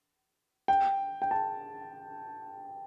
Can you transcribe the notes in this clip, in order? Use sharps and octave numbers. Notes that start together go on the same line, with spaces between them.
G5
G5
A5